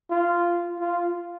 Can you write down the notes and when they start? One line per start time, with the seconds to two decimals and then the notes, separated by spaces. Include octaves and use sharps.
0.11 F4
0.80 F4